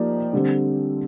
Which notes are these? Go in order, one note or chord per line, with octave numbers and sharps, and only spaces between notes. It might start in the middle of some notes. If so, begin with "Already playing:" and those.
Already playing: F3 A#3 D#4 G4 D5
D3 G3 C4